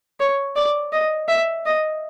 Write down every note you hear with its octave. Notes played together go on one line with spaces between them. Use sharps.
C#5
D5
D#5
E5
D#5